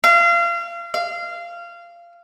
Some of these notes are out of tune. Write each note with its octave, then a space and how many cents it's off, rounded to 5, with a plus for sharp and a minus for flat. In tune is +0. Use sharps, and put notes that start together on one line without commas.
F5 -30
F5 -20